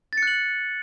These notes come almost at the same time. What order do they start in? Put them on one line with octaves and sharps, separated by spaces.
A6 C#7 F#6 F#7